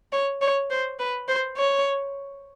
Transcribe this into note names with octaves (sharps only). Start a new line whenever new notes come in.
C#5
C#5
C5
B4
C5
C#5